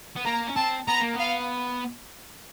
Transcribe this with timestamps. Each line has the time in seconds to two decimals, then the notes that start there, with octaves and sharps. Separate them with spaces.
0.16 B3
0.25 A#3 A#5
0.47 C#4
0.56 C4 A5
0.87 B3 A#5
1.00 A#3
1.14 B3
1.19 F5